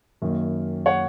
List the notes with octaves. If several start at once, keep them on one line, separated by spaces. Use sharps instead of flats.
F#2 D#3 A#3
C#5 F#5